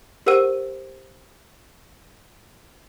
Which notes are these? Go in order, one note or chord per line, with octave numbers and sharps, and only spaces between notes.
G4 A#4 C5 F#5 E6 D#7